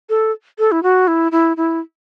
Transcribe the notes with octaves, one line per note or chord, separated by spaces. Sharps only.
A4
A4
E4
F#4
E4
E4
E4